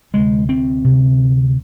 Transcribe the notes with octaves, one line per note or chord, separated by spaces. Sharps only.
D2 C3 G#3
C4
D2 C3